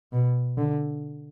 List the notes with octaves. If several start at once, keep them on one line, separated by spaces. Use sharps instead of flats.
B2
D3